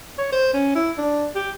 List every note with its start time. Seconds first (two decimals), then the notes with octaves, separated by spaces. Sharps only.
0.18 C#5
0.32 C5
0.53 C#4
0.75 E4
0.98 D4
1.35 G4